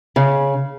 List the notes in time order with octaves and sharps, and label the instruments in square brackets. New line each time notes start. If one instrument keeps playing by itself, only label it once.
[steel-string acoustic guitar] C#3